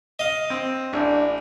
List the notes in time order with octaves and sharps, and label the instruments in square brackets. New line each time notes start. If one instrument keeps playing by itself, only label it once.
[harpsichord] D#5 F5
[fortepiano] C4
[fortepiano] A1 [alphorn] D4